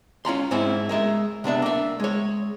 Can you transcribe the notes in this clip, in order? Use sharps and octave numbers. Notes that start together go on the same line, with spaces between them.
C#4 F4 A#5 C6
G#2 C4 C#4 E4
G#3 A#4 E5
C3 B3 D4 E5
A#3 E5
G#3 C#5